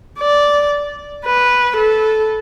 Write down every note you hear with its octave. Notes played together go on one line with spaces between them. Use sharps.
D5
B4
A4